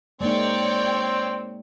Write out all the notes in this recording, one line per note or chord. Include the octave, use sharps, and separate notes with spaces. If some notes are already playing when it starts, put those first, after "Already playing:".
G#3 A#3 C4 D#4 C#5 D5 G5